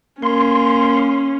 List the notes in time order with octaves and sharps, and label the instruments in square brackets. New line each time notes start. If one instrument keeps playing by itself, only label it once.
[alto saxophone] A#3 [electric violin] C#4 [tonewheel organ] C6